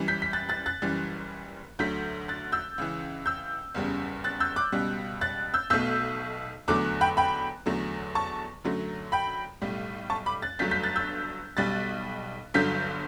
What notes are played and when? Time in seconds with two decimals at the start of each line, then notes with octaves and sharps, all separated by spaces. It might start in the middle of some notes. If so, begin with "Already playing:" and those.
Already playing: F#2 E3 G3
0.08 G6 B6
0.22 B6
0.33 F#6 A6
0.49 F#6 A6
0.66 F#6 A6
0.82 F#1 F#2 E3 G3
1.79 D2 D3 F#3 A3 G6 B6
2.28 F#6 A6
2.52 E6 G6
2.78 C#2 C#3 E3
3.26 E6 G6
3.75 F#1 E2 C#3 G3
4.24 F#6 A6
4.40 E6 G6
4.56 D6 F#6
4.72 C#2 B2 G3
5.21 F#6 A6
5.54 E6 G6
5.70 B1 B2 A3 E6 G6
6.68 E2 D3 F#3 A3 D6 F#6
7.01 G5 B5
7.17 G5 B5
7.66 E2 D3 F#3 A3
8.15 A5 C#6
8.64 F#2 D3 F#3 A3
9.12 G5 B5
9.62 B1 A2 G3
10.10 A5 C#6
10.26 B5 D6
10.42 F#6 A6
10.59 G1 G2 F#3 A3 G6 B6
10.71 G6 B6
10.84 F#6 A6
10.96 E6 G6
11.57 B1 B2 G3 F#6 A6
12.54 G1 G2 D3 F#3 G6 B6